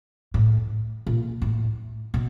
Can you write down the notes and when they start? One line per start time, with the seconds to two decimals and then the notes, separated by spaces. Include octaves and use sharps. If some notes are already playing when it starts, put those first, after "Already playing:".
0.34 A2
1.07 A#2
1.42 A2
2.14 B2